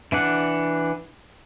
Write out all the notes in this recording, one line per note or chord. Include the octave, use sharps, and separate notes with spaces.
E3 D4 F#5